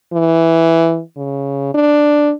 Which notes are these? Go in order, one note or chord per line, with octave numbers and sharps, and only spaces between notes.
E3
C#3
D4